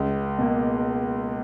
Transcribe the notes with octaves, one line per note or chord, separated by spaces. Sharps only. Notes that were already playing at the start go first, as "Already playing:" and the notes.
Already playing: C#2
B2 A#3